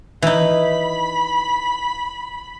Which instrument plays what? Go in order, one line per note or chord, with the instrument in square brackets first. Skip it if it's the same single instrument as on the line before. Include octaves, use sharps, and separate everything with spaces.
[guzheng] E3 D#4 [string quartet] B5